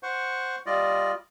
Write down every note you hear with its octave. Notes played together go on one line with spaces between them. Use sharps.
C5 F#5 C#6
G3 F4 D5 D#5